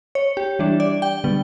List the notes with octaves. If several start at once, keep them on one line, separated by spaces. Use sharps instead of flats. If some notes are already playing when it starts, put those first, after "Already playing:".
C#5
G4
E3 G3 D4
D5
G5
D3 G3 B3